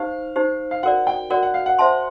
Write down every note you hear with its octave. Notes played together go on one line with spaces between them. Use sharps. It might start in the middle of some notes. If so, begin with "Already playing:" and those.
Already playing: D#4 G4 C5 F5
D#4 G4 C5
F5
F#4 A#4 D5 F#5
G5
F#4 A#4 D5 F#5
F#5
F5
F#5
C5 E5 A5 C6